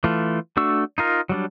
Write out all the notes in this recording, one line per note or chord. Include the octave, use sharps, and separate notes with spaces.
E3 A3 F4
A3 D4 F#4 C#6 E6
D#4 F4 A#4
F#3 G3 D4